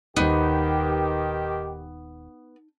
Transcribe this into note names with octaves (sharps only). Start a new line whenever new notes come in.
D#1 D#2 D#3 B3 D#4 G4 C5